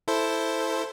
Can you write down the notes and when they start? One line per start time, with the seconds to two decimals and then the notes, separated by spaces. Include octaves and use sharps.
0.08 E4 A4 C5